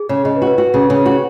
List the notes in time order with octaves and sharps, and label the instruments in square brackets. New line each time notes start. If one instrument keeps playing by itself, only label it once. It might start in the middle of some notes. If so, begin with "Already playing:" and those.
Already playing: [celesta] G#4
[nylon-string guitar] C#3 [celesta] C#5
[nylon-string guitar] C#3 [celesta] D#5
[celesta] B4
[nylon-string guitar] F#4
[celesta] B4
[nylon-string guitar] F#4 [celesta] B4
[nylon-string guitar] C#3 [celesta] B4
[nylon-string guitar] C#3 [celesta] C#5
[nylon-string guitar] F#4 [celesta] C#5